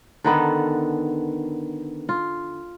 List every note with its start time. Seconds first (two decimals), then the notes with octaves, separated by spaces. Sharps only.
0.24 D3 D#3 B3 A4
2.09 F4